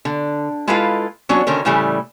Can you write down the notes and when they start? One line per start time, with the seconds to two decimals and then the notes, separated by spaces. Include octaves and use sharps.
0.05 D3
0.67 G#3 E4 F4 A4 B4 F5
1.29 F#3 C#4 D4 F#4 C#5
1.47 D3 D#3 C#4 A#4
1.65 A2 C#3 E3 G3 A3